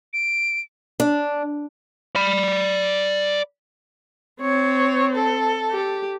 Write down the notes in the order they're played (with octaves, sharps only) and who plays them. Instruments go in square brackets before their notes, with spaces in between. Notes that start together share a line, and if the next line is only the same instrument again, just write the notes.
[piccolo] D7
[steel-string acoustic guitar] D4
[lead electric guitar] D5 B5
[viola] C4 [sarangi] C#5
[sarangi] A4
[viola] G4